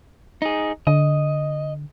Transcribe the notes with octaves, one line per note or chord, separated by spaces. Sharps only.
D#4 G#4
D3 D#5